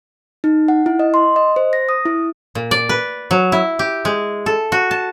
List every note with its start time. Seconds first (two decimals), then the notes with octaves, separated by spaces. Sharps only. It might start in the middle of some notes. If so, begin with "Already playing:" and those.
0.44 D#4
0.68 F#5
0.86 E4
0.99 D#5
1.14 C6
1.36 D#5
1.56 C5
1.73 A#6
1.89 D#6
2.06 E4
2.55 A#2
2.71 D5
2.89 B4
3.31 F#3
3.52 E4
3.79 G4
4.05 G#3
4.46 A4
4.72 F#4
4.91 A5